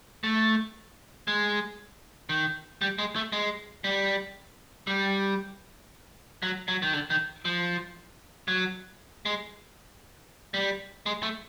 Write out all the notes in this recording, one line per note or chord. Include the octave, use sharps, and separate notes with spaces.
A3
G#3
D#3
G3
G#3
A3
G#3
G3
G3
F#3
F#3
D#3
D3
D#3
F3
F#3
G#3
G3
G#3
A3